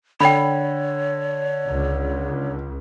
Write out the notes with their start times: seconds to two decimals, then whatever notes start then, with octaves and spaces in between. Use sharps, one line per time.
0.21 D3 C#5 G5 B5
1.69 C#2